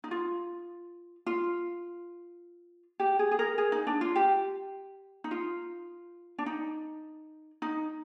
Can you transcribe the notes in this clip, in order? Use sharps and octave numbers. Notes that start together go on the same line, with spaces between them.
D#4
F4
F4
G4
G#4
G#4
A#4
G#4
D#4
D4
F4
G4
D#4
F4
D4
D#4
D#4